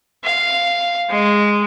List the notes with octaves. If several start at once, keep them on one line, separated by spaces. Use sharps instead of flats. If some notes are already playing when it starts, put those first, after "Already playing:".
F5
G#3